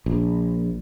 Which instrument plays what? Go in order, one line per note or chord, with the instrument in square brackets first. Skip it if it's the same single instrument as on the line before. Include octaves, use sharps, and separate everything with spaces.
[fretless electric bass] A#1